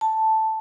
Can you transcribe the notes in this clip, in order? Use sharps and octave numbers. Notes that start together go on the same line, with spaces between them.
A5